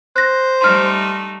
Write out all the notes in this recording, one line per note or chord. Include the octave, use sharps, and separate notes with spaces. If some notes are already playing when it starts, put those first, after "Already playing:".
C5 F#6 A#6
G3 A3 D#4 C6 F6